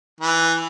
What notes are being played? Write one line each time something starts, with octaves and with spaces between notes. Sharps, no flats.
E3